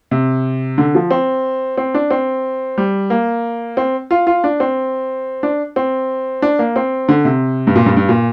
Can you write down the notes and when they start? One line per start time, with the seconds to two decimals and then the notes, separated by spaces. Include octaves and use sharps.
0.11 C3
0.78 D3
0.95 F3
1.11 C4
1.77 C4
1.94 D4
2.11 C4
2.78 G3
3.10 A#3
3.77 C4
4.11 F4
4.27 F4
4.44 D4
4.60 C4
5.43 D4
5.76 C4
6.42 D4
6.59 A#3
6.76 C4
7.09 D3
7.25 C3
7.67 G2
7.76 A#2
7.86 G2
7.97 G2
8.09 A#2